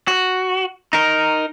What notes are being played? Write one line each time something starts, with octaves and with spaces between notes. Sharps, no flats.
F#4
D#4 A#4